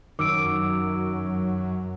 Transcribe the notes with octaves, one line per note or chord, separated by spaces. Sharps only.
F#2 D#3 F#3 D6 E6 D7